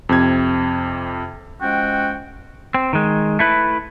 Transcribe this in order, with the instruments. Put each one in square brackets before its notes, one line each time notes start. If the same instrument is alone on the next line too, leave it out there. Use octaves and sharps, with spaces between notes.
[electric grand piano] F2 C3 G#6
[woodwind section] F3 G#3 C#4 F#4 G5
[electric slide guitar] C4
D#3 G#3
A3 E4 B4